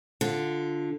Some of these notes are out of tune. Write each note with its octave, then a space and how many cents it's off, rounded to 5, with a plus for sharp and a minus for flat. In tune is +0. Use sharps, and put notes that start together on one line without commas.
D3 +0 F4 +0